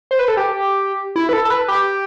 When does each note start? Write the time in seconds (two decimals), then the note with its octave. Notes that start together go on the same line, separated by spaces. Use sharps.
0.11 C5
0.19 B4
0.28 A4
0.37 G4
1.16 E4
1.29 B4
1.33 A4
1.45 A4
1.50 B4
1.68 G4